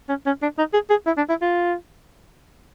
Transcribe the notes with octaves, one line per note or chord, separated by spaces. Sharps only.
C#4
C#4
D4
D#4
G#4
G#4
E4
D4
E4
F4